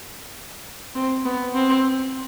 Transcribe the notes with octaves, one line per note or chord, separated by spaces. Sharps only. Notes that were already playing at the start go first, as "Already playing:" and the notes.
C4
B3
C4